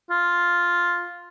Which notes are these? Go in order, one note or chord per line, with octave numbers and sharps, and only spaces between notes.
F4